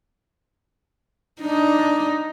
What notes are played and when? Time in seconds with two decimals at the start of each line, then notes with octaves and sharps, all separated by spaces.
1.41 D4 D#4